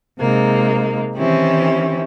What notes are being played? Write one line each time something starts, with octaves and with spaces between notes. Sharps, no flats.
C3 G#3 A#3 D#4
D#3 E3 C4 C#4 E4 G4